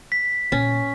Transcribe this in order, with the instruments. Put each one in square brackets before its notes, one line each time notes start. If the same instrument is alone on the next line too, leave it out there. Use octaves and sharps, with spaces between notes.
[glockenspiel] B6
[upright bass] A#2 [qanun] C#4